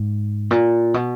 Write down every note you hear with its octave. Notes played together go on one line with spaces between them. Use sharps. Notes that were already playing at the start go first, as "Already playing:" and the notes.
Already playing: G#2
A#2
B2